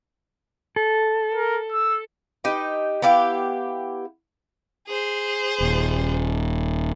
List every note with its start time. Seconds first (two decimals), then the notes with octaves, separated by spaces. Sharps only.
0.76 A4
1.34 A#4
1.72 E6
2.44 D#4 G4 B4
3.02 B3 E4 G4 F5
4.87 G#4 C5
5.60 D#1